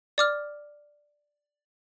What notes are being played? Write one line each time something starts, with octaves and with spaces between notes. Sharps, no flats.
D5 D6 F6